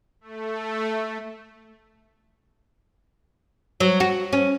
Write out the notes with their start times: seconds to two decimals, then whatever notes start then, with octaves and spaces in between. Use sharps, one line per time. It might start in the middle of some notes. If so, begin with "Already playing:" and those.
0.21 A3
3.80 F#3
4.00 F#4
4.33 C#4